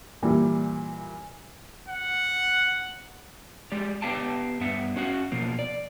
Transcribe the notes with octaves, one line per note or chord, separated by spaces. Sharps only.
A#2 E3 G3
F#5
G#3 G4 D5
B3 G4 F5 G5 A5
G2 B3 E5 F#5
C#4 F#4 F5 F#5
B2 F3 A#3
D5